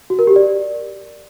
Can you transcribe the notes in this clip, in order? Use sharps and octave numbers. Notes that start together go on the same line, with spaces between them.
F#4
A#4
G4
D5